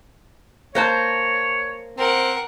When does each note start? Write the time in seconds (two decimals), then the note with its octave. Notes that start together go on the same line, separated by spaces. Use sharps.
0.75 A#3 C5 C#5 A5
1.98 C4 A#4 F#5